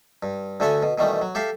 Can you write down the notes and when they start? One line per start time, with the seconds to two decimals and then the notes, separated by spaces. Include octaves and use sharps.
0.23 G2
0.60 D2 D3 A3 A4 E5 G#5
0.83 B2
0.98 B2 D#3 E3 G3 A3
1.21 F#3
1.35 G4 A4 E5 F5